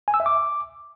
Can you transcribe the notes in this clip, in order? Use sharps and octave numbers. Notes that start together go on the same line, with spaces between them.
G#5
E6
E5
D6